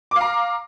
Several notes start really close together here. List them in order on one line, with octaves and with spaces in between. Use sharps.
D6 F5 A#5